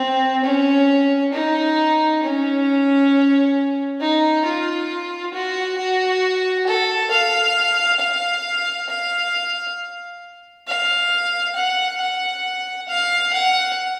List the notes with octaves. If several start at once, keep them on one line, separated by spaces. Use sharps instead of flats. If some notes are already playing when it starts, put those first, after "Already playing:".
Already playing: C4
C#4
D#4
C#4
D#4
F4
F#4
F#4
A4
F5
F5
F5
F5
F#5
F#5
F5
F#5